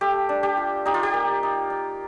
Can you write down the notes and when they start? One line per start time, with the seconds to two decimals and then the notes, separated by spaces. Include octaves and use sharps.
0.01 A3 G4
0.29 D4
0.43 G4
0.57 F4
0.86 D#4 G4
0.94 F4
1.03 G4
1.14 A#3
1.43 D#4
1.70 D#4